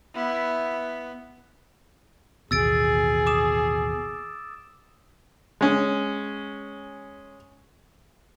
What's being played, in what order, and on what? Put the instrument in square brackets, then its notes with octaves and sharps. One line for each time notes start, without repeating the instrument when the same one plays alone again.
[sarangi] B3 [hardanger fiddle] E4
[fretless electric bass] A1 D#2 B2 [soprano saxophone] G#4 [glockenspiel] E6 A6 D7
[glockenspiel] D6 D#6 E7
[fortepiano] G#3 C#4